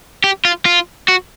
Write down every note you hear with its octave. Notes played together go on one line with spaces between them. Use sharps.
G4
F4
F4
F#4